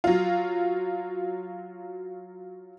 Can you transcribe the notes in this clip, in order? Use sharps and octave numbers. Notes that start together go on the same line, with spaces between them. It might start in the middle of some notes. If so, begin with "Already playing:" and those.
F#3 F4